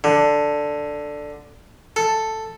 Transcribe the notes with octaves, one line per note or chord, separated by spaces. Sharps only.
D3
A4